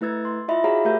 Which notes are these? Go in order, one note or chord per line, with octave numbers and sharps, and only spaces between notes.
A3 E4 B4 E6 G#6 A6
C6
E4 F4 D#5 E5 B5
F#4 G#4 C#5 F5 A#5 B5
A3 G4 A#4 E5 F5 G6